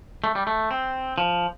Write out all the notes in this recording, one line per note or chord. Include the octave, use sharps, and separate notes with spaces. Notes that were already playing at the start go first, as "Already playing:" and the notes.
A3
G3
A3
C4
F3